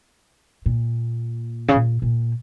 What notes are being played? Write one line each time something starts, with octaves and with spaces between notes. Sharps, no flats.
A#2
C#3
A#2
A#2